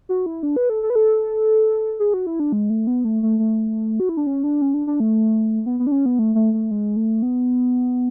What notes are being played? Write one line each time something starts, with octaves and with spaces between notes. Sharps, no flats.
F#4
E4
D4
B4
A4
A4
B4
A4
G#4
F#4
E4
D4
G#3
A3
B3
A3
A3
A3
F#4
E4
D4
C#4
D4
C#4
D4
D4
A3
B3
B3
D4
C#4
B3
A3
A3
A3
G#3
A3
B3